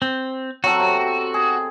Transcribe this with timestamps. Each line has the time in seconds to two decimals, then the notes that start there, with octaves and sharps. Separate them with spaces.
0.02 C4
0.64 F#3 C4 F#4 A4
0.80 C3
1.34 G#4